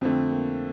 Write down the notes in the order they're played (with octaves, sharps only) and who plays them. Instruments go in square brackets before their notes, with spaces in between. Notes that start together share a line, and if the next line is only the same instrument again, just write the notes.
[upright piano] F2 D3 A3 [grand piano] C4
[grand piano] A#3